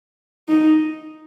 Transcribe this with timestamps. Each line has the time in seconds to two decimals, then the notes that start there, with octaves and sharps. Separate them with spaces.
0.49 D#4